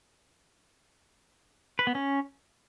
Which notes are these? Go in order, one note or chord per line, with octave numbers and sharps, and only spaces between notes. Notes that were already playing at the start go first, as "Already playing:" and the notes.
B4
B3
C#4